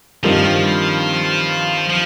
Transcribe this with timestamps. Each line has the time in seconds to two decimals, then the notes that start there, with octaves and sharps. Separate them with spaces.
0.23 G2 D#3 F3 G3 C4 F4
1.89 F3